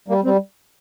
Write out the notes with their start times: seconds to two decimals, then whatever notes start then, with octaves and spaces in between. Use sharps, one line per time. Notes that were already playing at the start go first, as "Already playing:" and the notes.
0.08 G3 A#3
0.24 G3 C4